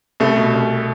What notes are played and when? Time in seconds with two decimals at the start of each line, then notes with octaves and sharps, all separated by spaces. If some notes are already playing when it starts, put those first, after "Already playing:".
0.20 C2 A3
0.37 B2
0.54 C2